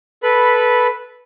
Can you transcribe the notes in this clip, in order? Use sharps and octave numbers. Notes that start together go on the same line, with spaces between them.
A4 B4 B5